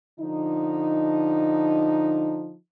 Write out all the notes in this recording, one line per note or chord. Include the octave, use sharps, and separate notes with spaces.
D3 F3 D#4